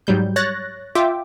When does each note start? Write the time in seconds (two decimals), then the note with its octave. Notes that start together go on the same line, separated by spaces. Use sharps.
0.07 G#2 F#3 G3 G6
0.36 C#5 F#6 A6 A#6
0.95 F4 E5 G5 D6